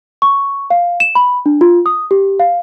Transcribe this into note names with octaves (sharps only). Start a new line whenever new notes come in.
C#6
F5
E7
B5
D4
F4
D#6
G4
F5